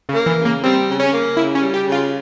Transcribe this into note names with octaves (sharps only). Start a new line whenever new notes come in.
C#3
A#3
E3
C#3
A#3
G3 C4
C#3
C#4
A#3
C#3 E4
C#4
G3
G4
C#3
F4